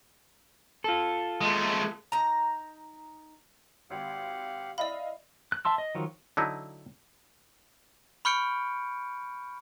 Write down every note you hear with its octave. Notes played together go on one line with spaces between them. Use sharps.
F4 A4
G#3 A3
D#4 A#5
G#1 G4 F5 F#5
E4 D5 D#5 F5 B5
F#6
E5 A5 C6 E6
D#5
D#3 F3 F#3
D3 F#3 D#4 E4
B5 C#6 F6 G6 C#7 D7